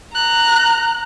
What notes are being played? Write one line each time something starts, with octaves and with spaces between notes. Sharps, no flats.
A#5 F#6